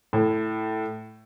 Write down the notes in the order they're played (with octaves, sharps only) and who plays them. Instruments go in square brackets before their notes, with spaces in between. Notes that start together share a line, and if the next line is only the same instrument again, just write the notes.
[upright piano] A2